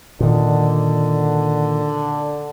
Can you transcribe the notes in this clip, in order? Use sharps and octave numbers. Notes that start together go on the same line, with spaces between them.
A#2 D3 D#3